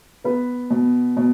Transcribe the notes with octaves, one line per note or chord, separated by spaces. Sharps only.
B3 B4
B2
B2